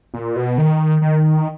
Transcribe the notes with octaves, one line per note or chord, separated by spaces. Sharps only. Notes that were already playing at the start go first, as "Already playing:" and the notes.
A#2
B2
D#3
D#3